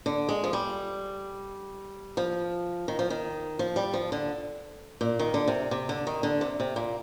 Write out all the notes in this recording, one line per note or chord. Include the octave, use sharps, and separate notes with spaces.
D3
G#3
F3
G3
F3
D#3
F3
D#3
F3
G3
F3
D3
A#2
D#3
D3
C3
C3
D3
D#3
D3
C3
C3
A#2